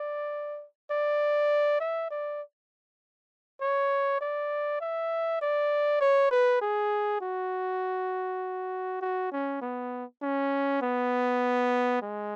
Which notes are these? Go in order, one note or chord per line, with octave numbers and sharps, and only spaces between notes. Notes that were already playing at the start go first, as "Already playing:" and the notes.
Already playing: D5
D5
E5
D5
C#5
D5
E5
D5
C#5
B4
G#4
F#4
F#4
C#4
B3
C#4
B3
G#3